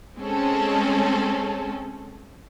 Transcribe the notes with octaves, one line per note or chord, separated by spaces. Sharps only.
G#3 C4 C#4 G#4 A4